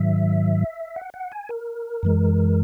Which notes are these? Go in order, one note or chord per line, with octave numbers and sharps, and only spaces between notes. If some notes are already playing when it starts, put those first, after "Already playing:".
Already playing: G#2 D#3 F#3 E5
F#5
F#5
G#5
A#4
F#2 E3 G#3